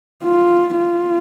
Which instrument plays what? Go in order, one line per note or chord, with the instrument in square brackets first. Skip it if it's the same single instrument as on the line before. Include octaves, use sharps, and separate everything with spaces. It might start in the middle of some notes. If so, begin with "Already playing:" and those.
[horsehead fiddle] F4
F4